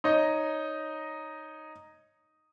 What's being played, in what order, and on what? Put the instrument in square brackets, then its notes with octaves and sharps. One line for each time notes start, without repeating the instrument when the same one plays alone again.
[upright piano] D#4 C#5 D#5